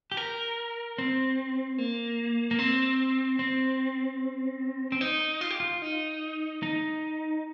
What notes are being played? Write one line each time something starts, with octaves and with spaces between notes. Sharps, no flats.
G4
A#4
C4
A#3
A#3
C4
C4
C4
D#4
F4
G4
F4
D#4
D#4